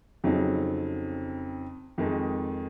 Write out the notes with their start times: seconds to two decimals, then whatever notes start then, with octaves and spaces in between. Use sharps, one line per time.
0.24 F2 C#3 F#3 C4 D#4
1.98 F2 D#3 G#3 D#4